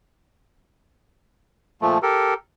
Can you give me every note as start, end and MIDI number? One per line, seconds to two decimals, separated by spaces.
1.82 1.98 46
1.82 1.98 53
1.82 1.98 57
2.02 2.34 67
2.02 2.34 69
2.02 2.34 70